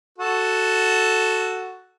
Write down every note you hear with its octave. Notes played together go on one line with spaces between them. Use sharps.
F#4 A4